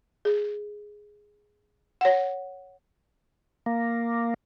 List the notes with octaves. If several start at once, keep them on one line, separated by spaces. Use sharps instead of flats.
G#4
C#5 F#5
A#3